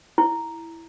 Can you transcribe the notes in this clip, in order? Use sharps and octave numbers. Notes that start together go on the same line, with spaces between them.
E4